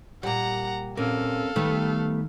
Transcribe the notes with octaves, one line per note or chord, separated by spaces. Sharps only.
A#2 G3 F#5 A#5
A#2 C4 C#4 A4 A#4 F5
D#3 G3 A3 B3